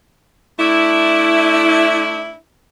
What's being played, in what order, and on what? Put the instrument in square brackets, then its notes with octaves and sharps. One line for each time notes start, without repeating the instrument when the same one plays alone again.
[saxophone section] A3 D4 E4